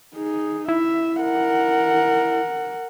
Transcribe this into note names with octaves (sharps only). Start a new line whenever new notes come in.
D#4 G#4
E4 E5
A#4 F#5